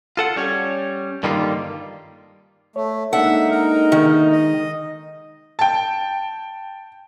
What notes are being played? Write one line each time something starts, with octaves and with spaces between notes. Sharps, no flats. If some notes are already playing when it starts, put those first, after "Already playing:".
F4 A4 F#5
G3 C#4 C#5
G2 D3 D#3 G3 A#3 F4
A3 C#5
G#3 A#3 D4 D#4 A4 E5 F#5
A#4
D#3
D#5
G5 A5